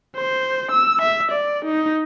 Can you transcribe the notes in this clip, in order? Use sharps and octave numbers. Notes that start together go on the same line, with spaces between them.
C5
E6
E5
D5
D#4